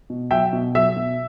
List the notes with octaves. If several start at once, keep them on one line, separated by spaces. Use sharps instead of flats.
B2
F#3 E5 G5
B2
F#3 E5
B2